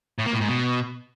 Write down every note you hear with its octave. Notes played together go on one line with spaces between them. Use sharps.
A2
A#3
A2
G#2
B2